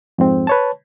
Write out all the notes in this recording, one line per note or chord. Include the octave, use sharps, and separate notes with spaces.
F2 G#2 C4
B4 C#5 A5